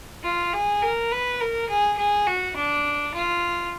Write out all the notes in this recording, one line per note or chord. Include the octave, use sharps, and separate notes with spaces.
F4
G#4
A#4
B4
A#4
G#4
G#4
F#4
D4
F4